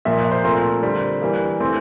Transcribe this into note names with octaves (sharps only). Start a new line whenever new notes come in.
A#2 F3 A#3 E5
E5
C5
A#2 A3 C4 A#4
D3 G3 C4
E3 G3 A#3
E3 A3 C4